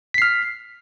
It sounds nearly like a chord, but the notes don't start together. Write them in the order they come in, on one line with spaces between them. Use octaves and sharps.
B6 C7 F6